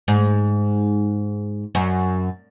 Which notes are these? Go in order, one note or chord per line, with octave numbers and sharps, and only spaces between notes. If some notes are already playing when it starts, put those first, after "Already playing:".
G#2
F#2